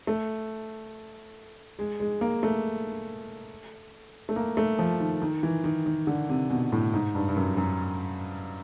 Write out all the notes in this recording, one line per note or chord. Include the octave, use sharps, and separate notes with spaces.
A3
G#3
G#3
A#3
A3
A3
A#3
A3
F3
D#3
D#3
E3
D#3
D#3
D3
C3
B2
A2
G#2
G2
G2
F#2
F#2